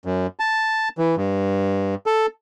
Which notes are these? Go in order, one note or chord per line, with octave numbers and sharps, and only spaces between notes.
F#2
A5
E3
G2
A4